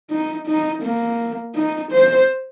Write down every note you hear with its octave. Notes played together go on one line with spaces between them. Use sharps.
D#4
D#4
A#3
D#4
C5